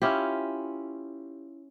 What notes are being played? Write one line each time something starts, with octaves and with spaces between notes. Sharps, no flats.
C#4 E4 F4 G4